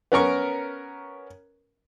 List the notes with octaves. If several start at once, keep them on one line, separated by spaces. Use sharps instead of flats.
B3 C#4 A#4 C#6